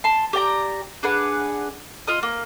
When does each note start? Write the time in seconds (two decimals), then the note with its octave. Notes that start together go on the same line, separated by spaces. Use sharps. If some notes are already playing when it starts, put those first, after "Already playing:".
0.04 A5 C6
0.33 G4 D5 G5 A#5
1.03 D4 G#4 B4 F#5
2.07 F4 D#5 D#6
2.23 A#3